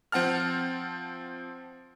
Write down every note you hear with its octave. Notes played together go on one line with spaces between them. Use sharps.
F3 C4 F#5 A5 F6